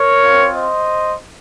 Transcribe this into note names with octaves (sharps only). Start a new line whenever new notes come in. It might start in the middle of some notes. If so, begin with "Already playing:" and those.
Already playing: A#4 C#5
C4 F4
C5 D#5